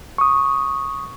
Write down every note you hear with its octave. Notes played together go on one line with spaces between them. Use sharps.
C#6 D#6